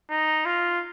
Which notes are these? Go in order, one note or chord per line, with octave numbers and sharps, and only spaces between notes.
D#4
F4